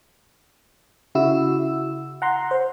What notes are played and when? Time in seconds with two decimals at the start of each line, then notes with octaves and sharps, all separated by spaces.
1.15 C#3 E4 F#4 E6
2.22 F#5 A#5 C6
2.51 C5